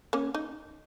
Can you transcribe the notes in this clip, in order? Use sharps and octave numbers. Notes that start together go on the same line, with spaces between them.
A#3 C#4
D#4